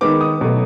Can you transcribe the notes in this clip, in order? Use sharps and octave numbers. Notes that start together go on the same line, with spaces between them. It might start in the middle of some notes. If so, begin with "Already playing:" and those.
D#3 G#3 B3 D6
D#6
B2 F#3 A3